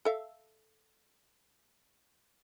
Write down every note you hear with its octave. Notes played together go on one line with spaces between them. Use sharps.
A4 E5 F5